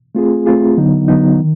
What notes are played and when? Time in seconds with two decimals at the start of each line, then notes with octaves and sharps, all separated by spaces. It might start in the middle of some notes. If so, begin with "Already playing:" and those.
0.15 A3 C4 F4 G#4
0.46 A3 C4 F4 G#4
0.77 D3 F#3 B3 D#4
1.08 D3 F#3 B3 D#4
1.39 D#3